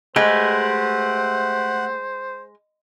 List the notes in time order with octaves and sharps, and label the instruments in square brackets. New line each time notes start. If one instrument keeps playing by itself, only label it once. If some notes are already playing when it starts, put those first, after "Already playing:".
[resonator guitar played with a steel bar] G#3 [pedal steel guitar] A3 G4 B4 [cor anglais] C5 [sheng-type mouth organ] F#5